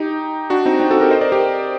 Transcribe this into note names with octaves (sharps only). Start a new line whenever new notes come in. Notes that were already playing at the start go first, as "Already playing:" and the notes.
Already playing: D#4 G4
D4 F#4
C4 D#4
C4 D#4
F#4 A4
G4 A#4
C5 D#5
A#4 D5
G4 A#4